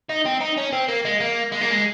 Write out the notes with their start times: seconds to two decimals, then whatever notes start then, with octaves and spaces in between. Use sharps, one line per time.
0.09 D#4
0.25 C4
0.40 D#4
0.57 C#4
0.72 C4
0.88 A#3
1.05 G#3
1.20 A#3
1.52 G#3
1.61 A#3
1.71 G#3